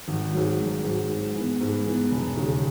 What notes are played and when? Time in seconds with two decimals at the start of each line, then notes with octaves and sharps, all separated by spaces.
0.08 G#1
0.33 G#2 F#3
0.59 G#1
0.84 G#2 F#3
1.10 G#2
1.35 E3 B3
1.61 G#2
1.86 E3 B3
2.12 E1
2.37 D#2 C#3